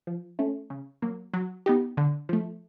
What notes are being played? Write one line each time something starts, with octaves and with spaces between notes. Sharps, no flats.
F3
A3 C#4
C#3
F#3 A#3
F#3
B3 D#4 G4
D3
F3 A3